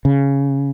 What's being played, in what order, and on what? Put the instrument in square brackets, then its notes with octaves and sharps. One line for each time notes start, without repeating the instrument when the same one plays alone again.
[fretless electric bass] C#3